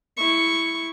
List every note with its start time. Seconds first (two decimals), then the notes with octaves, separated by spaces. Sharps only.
0.17 E4 C#6